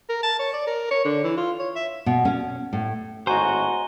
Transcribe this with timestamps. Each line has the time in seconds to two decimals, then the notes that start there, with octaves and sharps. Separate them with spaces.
0.10 A#4
0.23 A5
0.39 C#5
0.53 D5
0.67 A#4
0.91 C#5
1.05 D3
1.24 E3
1.37 F4
1.59 C#5
1.76 E5
2.06 B2
2.25 C#4
2.73 A2
3.27 G#1 A2 F#4 C5 D#5 G#5 A#5 G7